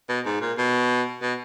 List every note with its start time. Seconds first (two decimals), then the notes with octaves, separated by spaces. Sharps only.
0.09 B2
0.25 G#2
0.41 A#2
0.58 B2
1.22 B2